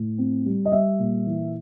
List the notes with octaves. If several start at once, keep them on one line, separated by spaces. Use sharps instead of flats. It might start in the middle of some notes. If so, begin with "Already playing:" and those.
Already playing: A2
C4
G3
D#5
G3 E5
A#2
E3